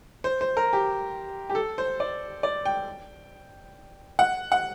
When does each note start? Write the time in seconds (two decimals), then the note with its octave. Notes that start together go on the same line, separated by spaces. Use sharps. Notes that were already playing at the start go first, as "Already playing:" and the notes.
0.24 C5
0.41 C5
0.57 A#4
0.73 G4
1.50 G4
1.55 A4
1.78 C5
2.00 D5
2.43 D5
2.65 G5
4.19 F#5
4.52 F#5